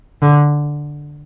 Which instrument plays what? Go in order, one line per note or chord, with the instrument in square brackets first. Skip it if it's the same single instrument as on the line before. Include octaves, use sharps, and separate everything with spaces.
[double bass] D3